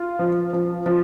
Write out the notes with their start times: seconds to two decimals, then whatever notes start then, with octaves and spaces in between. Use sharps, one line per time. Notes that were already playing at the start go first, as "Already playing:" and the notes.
Already playing: F4
0.19 F3
0.53 F3
0.86 F3